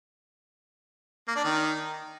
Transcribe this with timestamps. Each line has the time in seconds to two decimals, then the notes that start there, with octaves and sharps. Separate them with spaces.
1.28 A#3
1.36 D4
1.44 D#3